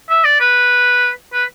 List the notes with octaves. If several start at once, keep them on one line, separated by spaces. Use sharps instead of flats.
E5
D5
B4
B4